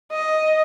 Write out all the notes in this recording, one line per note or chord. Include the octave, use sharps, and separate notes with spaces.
D#5